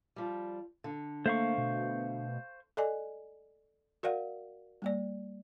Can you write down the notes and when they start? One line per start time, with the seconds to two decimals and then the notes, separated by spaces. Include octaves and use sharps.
0.16 F3 G3
0.84 D3
1.26 A3 A#3 C5 F5 C#6
1.58 B2
2.77 A4 D5 D#5 G#5
4.03 F#4 A#4 D5 F5 F#5
4.82 G3 A#3 D5